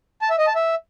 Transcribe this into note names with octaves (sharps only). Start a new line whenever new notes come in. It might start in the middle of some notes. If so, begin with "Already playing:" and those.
A5
E5
D#5
A5
E5